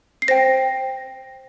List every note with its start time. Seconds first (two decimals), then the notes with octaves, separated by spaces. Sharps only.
0.22 C7
0.28 C5 G5 A#6